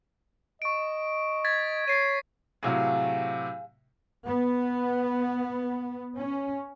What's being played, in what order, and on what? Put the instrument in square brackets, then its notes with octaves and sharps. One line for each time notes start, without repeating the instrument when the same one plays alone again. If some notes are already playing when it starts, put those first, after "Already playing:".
[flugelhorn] D#5 [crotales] C#6 D7
[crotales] G#6 A6 B6
[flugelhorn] C#5 [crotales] A6 C7 D#7
[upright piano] A2 C3 F#3 [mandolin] G#4 F5
[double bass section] B3
C#4